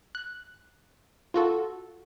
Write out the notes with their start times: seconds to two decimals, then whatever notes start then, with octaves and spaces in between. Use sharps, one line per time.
0.15 F#6
1.34 F4 F#4 A4